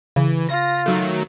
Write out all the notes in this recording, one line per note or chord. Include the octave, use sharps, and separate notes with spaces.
C#3 E3
F4 A#6
D#3 F#3 A3